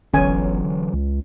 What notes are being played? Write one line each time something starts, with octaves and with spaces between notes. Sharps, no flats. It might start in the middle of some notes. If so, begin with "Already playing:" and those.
D1 G1 D3 E3 F#3 C#4 G#5
C#2